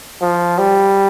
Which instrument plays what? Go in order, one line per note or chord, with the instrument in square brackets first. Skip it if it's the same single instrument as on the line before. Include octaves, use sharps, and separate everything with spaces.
[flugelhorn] F3
G3